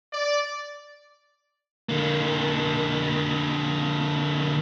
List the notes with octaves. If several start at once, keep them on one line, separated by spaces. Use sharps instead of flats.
D5
D3 A#3